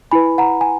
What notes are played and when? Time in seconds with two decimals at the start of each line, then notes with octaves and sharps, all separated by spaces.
0.11 E4 B4 G#5 B5
0.38 F#5 A#5
0.61 G#5